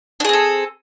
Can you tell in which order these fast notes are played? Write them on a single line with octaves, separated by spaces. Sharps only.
D4 G#4 C4 A4